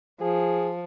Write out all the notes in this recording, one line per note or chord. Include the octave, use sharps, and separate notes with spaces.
F3 G#4